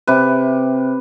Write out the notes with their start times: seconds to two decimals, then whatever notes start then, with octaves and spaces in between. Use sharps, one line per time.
0.07 C3 B4